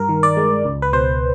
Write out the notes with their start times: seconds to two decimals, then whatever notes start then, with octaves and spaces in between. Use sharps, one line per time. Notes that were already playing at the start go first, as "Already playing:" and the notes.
Already playing: G2 A#4
0.09 D#3
0.23 D5
0.37 G#3
0.65 C#2
0.82 B4
0.93 B2 C5